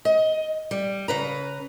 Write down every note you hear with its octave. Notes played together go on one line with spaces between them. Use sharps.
D#5
G3
C#3 B4 A#5